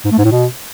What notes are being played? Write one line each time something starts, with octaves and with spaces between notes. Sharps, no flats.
G#2
A3
G#2
A2
B2